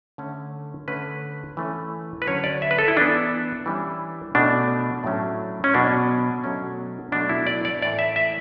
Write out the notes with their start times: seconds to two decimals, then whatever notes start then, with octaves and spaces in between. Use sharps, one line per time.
0.18 D3 A3 C#4
0.88 D3 A3 C#4 B4
1.57 E3 A3 C#4
2.22 B4
2.27 D3 F#3 C#4 C#5
2.44 D5
2.62 E5
2.71 B4
2.79 A4
2.88 E4
2.96 E3 B3 D4
3.66 E3 G3 C#4
4.35 B2 A3 C#4 D4
5.04 A2 F#3 A3 C#4
5.64 C#4
5.74 B2 F#3 B3 D4
6.44 B2 F#3 A3 C#4
7.12 B2 F#3 A3 D4
7.29 E4
7.47 D5
7.65 D5
7.82 A2 E3 A3 D5
7.99 E5
8.16 E5